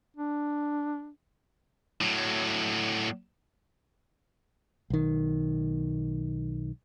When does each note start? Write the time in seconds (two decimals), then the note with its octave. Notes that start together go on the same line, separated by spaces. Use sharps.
0.16 D4
2.01 A2 F#3
4.90 B1 D#3